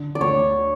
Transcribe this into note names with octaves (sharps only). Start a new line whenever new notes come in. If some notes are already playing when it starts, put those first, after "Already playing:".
Already playing: D3
D5
D2 C#5